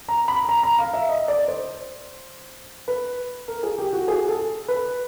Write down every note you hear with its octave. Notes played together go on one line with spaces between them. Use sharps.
A#5
B5
A#5
A#5
F5
E5
D#5
D5
C5
B4
A#4
G#4
G4
F#4
G#4
A4
B4